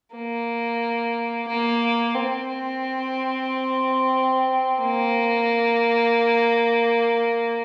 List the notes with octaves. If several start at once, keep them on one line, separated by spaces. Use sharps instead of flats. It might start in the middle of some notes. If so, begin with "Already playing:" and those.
A#3
A#3
C4
A#3